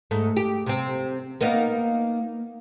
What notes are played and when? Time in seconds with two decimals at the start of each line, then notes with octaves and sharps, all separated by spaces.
0.11 G#2 A3
0.37 G4
0.66 C3 C4
1.41 A#3 B3 D#4